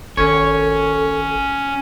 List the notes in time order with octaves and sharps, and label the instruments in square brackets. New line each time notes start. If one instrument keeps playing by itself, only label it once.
[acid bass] G#1 [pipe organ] C#4 [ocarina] A4 [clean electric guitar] C#5